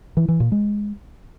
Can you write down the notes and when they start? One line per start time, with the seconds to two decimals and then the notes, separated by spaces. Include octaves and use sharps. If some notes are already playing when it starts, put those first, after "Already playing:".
0.17 E3
0.28 E3
0.40 A#2
0.52 G#3